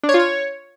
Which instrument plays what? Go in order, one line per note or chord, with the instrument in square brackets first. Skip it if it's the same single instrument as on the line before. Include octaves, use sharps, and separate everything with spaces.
[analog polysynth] D4
C#5
F4
C#5